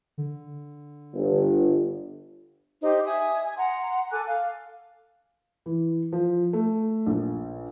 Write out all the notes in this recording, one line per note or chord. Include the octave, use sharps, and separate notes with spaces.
D3
G1
D#4 G4 C5
E5 G#5 D#6
G#5
F#5 A#5 C6
A4 G#5 D6 F#6
F5
E3
F3
A3
A#1